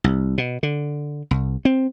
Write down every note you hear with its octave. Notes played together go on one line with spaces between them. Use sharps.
C2
B2
D3
C2
C4